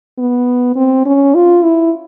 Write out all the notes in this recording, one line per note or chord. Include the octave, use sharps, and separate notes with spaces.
B3
C4
C#4
F4
E4